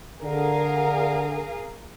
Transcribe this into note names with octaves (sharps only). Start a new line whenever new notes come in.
D3 G#4 A#4 F5